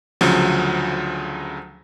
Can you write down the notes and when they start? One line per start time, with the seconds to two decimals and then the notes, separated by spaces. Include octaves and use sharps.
0.21 D2 C#3 F3 F#3